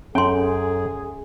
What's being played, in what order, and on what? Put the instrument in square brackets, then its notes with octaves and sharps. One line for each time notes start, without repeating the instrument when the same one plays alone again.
[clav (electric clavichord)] F#2 G5 [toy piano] C#4 C6 [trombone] G#4 [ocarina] A4